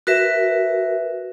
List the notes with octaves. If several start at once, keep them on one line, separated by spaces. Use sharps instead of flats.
F#4 A#4 B4 E5